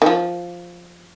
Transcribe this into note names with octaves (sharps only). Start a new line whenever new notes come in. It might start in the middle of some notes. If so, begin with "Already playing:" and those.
D#3
F3